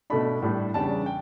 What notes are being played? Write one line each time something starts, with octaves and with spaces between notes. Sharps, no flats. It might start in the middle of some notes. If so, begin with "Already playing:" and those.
B2 A3 D4 B5
A2 G3 D4
E2 C#3 G3 D4 A5
G5